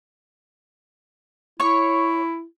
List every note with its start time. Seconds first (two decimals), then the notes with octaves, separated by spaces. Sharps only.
1.60 E4 C#5 C#6